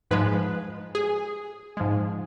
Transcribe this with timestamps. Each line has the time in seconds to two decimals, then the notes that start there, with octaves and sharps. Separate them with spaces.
0.11 G#2 F3 G#3 B4
0.95 G#4
1.77 G#2 F3 G#3